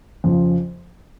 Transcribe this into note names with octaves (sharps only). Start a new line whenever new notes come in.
F2 C#3 F3